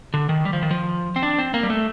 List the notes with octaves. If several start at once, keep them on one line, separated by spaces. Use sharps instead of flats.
D3
D#3
G3
F3
D#3
F3
C4
D4
C4
A#3
G3
A3